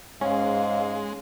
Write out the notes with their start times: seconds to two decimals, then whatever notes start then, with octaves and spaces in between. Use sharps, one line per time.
0.21 G#2 G#3 C#4 F5